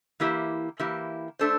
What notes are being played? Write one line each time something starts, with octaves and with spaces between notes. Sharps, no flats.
E3 A#3 E4 G4
E3 A#3 E4 G4
A3 D4 A4 C5